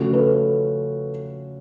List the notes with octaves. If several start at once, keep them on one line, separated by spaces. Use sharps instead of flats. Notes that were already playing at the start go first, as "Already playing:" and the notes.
Already playing: C#3 F3 A3 C#4 F#4
A4 B4